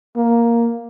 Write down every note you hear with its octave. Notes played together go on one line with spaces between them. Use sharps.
A#3